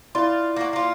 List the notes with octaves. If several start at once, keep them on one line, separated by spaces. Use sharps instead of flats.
E4 F4 D5 C6
A#3 F#4
A#3 F4